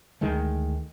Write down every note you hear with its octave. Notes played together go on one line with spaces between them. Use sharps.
D2 D#3 G#3 A3